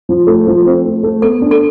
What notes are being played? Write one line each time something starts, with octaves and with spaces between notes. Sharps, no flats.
F3
A3
F3
C4
A3
A3
B3 A4
D4
A4